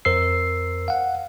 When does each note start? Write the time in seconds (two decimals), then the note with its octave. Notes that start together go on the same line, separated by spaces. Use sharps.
0.05 F2 A#4 C5 E6 C7
0.88 F5 F#5